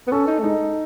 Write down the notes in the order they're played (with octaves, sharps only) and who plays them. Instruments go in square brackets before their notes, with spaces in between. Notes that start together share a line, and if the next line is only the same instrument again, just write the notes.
[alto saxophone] B3
[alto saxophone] C#4 [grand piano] A4
[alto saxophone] D#4
A3
[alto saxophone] G#3 [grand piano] D#4